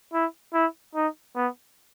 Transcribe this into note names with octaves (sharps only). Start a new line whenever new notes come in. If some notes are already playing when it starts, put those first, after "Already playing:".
E4
E4
D#4
B3